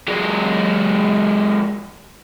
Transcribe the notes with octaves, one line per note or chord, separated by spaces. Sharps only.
F#3 G#3